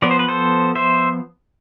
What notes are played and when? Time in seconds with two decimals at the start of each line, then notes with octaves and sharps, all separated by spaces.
0.02 F3 B3 D5
0.11 C5
0.19 B4
0.28 A4 C5
0.75 C5 E5